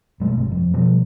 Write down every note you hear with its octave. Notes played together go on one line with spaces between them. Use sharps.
B1 G#3 A3
G1 C3
F2
B2 F3 G3 B3